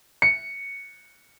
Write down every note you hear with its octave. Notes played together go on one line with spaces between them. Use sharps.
C#7